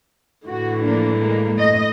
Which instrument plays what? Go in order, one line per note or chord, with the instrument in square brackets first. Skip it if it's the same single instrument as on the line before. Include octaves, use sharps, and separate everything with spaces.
[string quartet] A2 D3 E3 [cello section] F#4
[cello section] F3 A#3 D4
G#3 A#3
A3 D#5